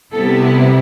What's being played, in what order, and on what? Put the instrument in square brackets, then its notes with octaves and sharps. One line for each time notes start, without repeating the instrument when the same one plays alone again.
[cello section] C3 G3 B3 E4 A4